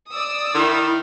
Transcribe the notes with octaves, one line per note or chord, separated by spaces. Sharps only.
D5 D#6 E6
D#3 E4